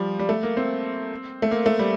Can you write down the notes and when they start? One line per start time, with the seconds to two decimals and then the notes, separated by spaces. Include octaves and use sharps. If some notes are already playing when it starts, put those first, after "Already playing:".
Already playing: F3 G3
0.19 G3
0.29 A3
0.43 A#3
0.57 C4
1.42 A3
1.51 A#3
1.66 A3
1.79 G3